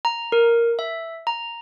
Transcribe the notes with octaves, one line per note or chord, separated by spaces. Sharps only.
A#5
A#4
E5
A#5